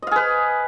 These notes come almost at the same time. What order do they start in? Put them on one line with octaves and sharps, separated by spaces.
D#5 F5 G#4 B4